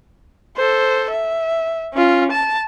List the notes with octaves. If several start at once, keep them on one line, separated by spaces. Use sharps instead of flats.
A4 C5
E5
C#4 F4
A5